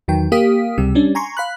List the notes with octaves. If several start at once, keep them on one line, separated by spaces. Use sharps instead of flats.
E2 D#3 F#3 G5
A#3 G4 F5 D#6 B6
C#2 C3 G3 E6
G3 C#4 D4
G#5 A#5 C6 C#6
F5 B5 F#6